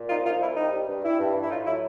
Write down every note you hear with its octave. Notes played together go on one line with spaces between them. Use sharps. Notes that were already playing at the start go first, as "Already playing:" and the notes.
Already playing: A#2
C2 D#4 F4
F3 D#4 F4
C2 E4
G3 D#4
G3
G2
G3 E4
G2
E3
E4
A2 D#4 F4
F#3 E4